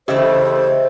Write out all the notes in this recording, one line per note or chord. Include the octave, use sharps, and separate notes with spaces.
C#3 E3 A3 G4 C5 D#5 E5